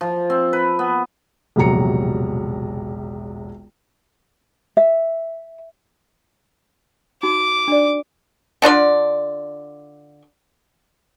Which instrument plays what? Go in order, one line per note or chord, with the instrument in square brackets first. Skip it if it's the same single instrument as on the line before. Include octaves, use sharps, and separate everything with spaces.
[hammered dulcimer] F3
C4
B4
B3
[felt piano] E1 A#1 C3 F#3 A#5 C#7
[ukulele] E5
[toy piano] D#4 F#4 [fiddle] D6
[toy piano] D4 D5
[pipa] D3 D4 F4 D5